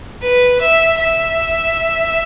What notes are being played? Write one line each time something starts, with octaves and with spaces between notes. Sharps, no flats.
B4
E5
E5